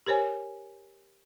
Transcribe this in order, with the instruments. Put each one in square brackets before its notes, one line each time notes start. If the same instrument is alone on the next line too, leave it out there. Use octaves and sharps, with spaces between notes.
[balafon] G4 A#4 C5 C#5 G#5